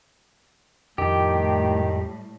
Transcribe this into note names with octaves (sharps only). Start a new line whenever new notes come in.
F2 A2 D#3 G3 G4